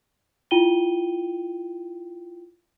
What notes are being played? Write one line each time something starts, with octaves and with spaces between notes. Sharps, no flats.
E4 F4 G5 D#7 G7